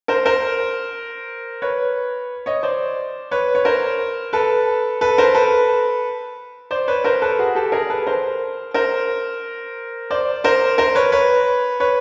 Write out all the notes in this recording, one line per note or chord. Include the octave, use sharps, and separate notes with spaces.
A#4 C5
A#4 C5
B4 C#5
C#5 D#5
C5 D5
B4 C#5
C#5
A#4 C5
A4 B4
A4 B4
A#4 C5
A4 B4
C5 D5
B4 C#5
A#4 C5
A4 B4
F#4 G#4
G4 A4
G#4 A#4
A4 B4
A#4 C5
A#4 C5
C5 D5
A#4 C5
A#4 C5
B4 C#5
B4 C#5
B4 C#5